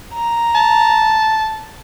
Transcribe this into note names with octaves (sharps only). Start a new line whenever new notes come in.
A#5
A5